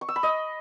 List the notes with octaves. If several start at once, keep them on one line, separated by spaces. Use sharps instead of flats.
C#6
E6
B5
D#5